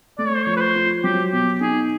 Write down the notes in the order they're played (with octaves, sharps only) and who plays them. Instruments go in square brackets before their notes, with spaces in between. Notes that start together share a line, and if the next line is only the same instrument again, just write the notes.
[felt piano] A3 [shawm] D5
[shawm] C#5
C5
[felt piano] F3 [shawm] C#5
[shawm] B4
C5
[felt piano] F4
[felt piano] F#3 [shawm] G4
[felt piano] B2 [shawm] G4
[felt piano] D#4 [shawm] G#4